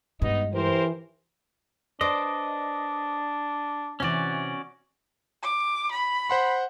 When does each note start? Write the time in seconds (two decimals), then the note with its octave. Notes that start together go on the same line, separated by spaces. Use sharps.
0.22 G2 G#3 B3 D#4 D#5
0.54 E3 G4 A#4 C5
2.01 D4 B4 C5 D5 D#5
4.00 C3 E3 C#4 F#4 D5
5.42 D6
5.91 B5
6.30 C5 F#5 C6